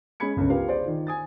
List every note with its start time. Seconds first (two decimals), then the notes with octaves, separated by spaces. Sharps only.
0.20 G#3 C#4 G#4 B5 G#6 C#7
0.36 G1 C#2 C#4
0.49 F4 G4 A#4 B4 F5
0.68 G#4 C5 D5
0.85 D#3 F4
1.07 G#5 D#6 A6